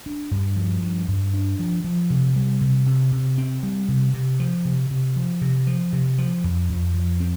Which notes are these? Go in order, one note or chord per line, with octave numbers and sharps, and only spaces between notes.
D4
G2
F3
G2
G2
D4
F3
F3
C3
G3
C3
C3
C3
C4
G3
C3
C3
F3
C3
C3
F3
C3
F3
C3
F3
F2
F2
F3
C4